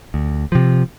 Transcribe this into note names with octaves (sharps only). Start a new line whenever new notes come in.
D2
C3 F3